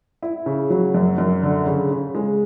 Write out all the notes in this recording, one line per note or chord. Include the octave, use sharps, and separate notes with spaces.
E4
C#3
F#3
F#2
F#2
D3
C#3
C#3
G#3